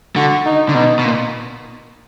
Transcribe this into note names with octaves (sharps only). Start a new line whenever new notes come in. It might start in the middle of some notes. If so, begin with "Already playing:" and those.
D3 F#4
D#4
D3
B2 D#4
B2
A#2